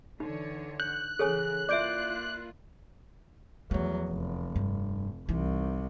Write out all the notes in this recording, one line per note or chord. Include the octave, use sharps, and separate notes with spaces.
D3 E3 D#4 C#5
F#6 G6
C#3 E3 G#4 A4 C#5 G#5
A#3 E4 F4 D5 E5 D6 G6 D7
E2 F3 F#3 A3
F1
G2 C4
C2 C3 E3 D#4